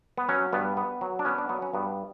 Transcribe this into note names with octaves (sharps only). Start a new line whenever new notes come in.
B3
F#3 C#4
G2 B3
B3
F#3
D4
B3 C#4
D4
F#3 B3
C#4
G2 B3